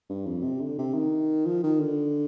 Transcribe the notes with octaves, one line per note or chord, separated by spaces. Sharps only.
G2
F2
C3
D3
C3
D#3
F3
D#3
D3